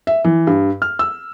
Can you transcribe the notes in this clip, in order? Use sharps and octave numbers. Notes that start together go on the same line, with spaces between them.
E5
E3
G2
F6
E6